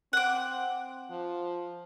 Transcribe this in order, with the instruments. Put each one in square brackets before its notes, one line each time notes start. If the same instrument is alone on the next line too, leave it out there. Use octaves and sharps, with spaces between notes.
[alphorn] C4 [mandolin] F#5 D6
[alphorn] F3